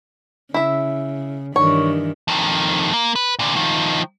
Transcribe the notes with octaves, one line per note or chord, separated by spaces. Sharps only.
C#3 E4 E5
G2 D#3 E3 C#5
F2 D#3
A#3
B4
A#2 D3
D#3 F3